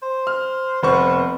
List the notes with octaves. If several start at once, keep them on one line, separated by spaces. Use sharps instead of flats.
C5
F6
F1 B3 C5 C#6